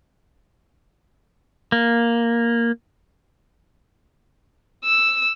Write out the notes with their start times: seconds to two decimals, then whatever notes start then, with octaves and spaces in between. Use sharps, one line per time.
1.72 A#3
4.85 E6